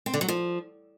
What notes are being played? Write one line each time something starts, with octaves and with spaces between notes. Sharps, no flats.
C4
D3
F#3
F3